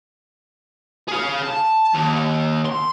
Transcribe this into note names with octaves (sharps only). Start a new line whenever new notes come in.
G#4 F5
A5
D#2
C6